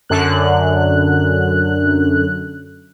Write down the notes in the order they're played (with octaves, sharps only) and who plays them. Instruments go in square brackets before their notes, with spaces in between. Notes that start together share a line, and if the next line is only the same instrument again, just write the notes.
[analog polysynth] F#2 D3 F#6